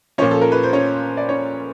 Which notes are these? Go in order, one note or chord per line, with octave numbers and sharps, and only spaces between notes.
A#2 F3 C#4 C#5
A4
A#4
B4
C5
C#4 C#5
D5
C#4 C#5